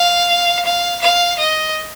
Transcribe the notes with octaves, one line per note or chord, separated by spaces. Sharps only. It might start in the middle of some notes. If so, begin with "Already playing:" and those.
Already playing: F5
F5
F5
D#5